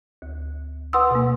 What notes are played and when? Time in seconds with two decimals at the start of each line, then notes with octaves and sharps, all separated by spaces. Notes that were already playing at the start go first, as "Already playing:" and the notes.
0.22 D2
0.93 B4 F#5 C6 D#6 E6
1.11 B2 A#3